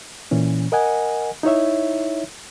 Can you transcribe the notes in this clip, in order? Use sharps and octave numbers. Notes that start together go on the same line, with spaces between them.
A#2 E3 C#4
A#4 D#5 F#5 G#5
D#4 E4 C#5 E5